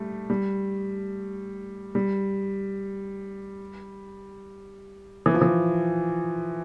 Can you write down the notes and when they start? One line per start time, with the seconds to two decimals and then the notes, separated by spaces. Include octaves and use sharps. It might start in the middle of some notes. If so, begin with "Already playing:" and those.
Already playing: G3 A3
0.30 G3
1.95 G3
5.26 E3
5.34 F3
5.41 E3